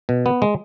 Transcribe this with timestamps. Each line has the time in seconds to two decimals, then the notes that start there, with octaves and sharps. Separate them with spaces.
0.09 B2
0.26 B3
0.42 G#3